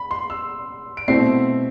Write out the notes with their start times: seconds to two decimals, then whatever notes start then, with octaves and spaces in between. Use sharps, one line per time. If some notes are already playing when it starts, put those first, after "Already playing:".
Already playing: B5
0.11 C6
0.30 E6
0.97 D7
1.08 B2 A3 C4 E4 C7